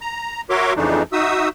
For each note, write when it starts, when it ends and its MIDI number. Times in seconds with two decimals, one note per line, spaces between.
0.01 0.41 82
0.50 0.73 66
0.50 0.73 70
0.50 0.73 73
0.50 0.73 76
0.50 0.73 84
0.50 0.73 86
0.76 1.03 41
0.76 1.03 49
0.76 1.03 52
0.76 1.03 57
0.76 1.03 62
0.76 1.03 63
1.13 1.49 63
1.13 1.49 66
1.13 1.49 76
1.13 1.49 87
1.13 1.49 88